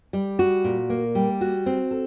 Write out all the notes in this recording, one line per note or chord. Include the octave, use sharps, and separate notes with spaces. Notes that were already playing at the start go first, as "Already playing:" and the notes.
G3
F#4
A#2
A#3
G3
F#4
C4
A4